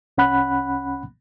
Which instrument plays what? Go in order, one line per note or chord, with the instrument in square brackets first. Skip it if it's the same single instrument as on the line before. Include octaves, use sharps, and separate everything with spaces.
[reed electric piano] C2 C#4 F#5 B5 F#6